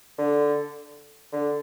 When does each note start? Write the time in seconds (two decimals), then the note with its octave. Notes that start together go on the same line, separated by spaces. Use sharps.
0.18 D3
1.33 D3